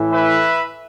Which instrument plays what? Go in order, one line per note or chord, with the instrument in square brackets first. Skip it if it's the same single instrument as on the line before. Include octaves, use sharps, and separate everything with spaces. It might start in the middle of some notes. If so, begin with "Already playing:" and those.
Already playing: [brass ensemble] A2 E3
B4 E5